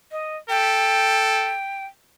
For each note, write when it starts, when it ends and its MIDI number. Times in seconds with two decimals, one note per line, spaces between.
0.12 0.37 75
0.50 1.56 69
0.50 1.85 79